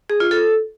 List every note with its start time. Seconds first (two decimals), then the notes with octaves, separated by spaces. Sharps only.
0.10 G#4
0.20 F4
0.31 A4